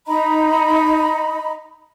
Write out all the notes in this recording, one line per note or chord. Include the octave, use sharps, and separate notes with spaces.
D#4 D#5 A#5 B5